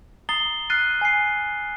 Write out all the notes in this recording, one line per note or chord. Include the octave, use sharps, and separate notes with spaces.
A#5 D#6 A6 C7 G7
F6 F#6 A6 C7 D#7
G#5 C7